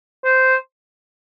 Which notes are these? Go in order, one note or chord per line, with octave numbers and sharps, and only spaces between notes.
C5